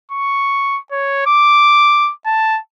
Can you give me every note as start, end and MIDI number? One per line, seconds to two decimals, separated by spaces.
0.11 0.79 85
0.92 1.24 73
1.27 2.12 86
2.26 2.59 81